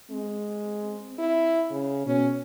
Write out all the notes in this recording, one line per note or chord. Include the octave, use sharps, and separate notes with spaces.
G#3 C4
E4
C#3
B2 C#4